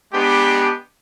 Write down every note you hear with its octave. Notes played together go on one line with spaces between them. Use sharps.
G#3 B3 D4 G4